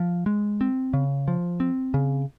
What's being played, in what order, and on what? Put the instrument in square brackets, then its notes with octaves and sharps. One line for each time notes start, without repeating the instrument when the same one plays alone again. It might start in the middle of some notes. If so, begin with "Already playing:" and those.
Already playing: [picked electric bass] F3
G#3
C4
C#3
F3
C4
C#3